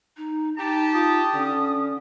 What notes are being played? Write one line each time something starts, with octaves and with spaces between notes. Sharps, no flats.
D#4
D#4 G4 A5
F4 D#6
D3 C#4